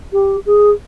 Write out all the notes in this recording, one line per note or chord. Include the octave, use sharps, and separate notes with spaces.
G4
G#4